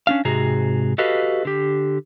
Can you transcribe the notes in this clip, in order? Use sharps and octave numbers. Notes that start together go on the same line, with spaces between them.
C#4 D4 F5
G#2 C3 F#4 G#4 A#5
F#4 G4 A4 B4 D#5 F5
D3 G4